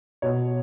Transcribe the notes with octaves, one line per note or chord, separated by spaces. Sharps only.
B2 C#5